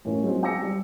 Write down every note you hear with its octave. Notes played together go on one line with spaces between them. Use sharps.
A1 A#3 C#4
F#3 G#3 B3 C4
G5 D6 E6 A#6 C#7
G3